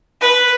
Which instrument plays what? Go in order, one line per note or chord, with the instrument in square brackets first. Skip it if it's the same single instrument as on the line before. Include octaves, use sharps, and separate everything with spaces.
[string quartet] B4